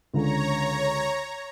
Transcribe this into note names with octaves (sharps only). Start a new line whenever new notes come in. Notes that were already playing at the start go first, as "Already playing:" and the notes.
C#2 D3 C#5 A#5